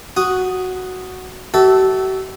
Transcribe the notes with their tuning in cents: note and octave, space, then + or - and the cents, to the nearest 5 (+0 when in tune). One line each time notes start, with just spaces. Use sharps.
F#4 +0 D#6 +0
F#4 +45 A4 +0 E5 -10